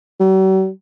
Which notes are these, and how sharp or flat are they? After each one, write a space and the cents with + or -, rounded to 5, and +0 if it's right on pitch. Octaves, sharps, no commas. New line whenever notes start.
F#3 +45